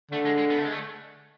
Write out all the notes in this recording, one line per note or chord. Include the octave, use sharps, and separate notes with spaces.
D3 A3
G#3
G#3
B3
A3
G#3
A3